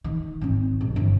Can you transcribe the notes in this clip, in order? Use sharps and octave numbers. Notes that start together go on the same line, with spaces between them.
D#3
G#1 C4
B1
G1